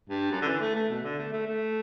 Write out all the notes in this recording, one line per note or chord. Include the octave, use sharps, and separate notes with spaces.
G2
F#2
D3
E3
A3
A3
B2
D3
A3
A3
A3